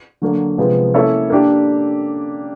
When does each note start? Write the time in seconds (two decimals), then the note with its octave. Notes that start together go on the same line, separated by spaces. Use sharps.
0.22 D3 F#3 A#3
0.58 C3 F3 G#3 B3
0.94 A#3 C#4 E4 A4 C#5
1.30 A#3 D4 G4